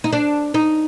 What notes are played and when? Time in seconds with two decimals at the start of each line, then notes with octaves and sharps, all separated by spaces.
0.04 D#4
0.13 D4
0.54 D#4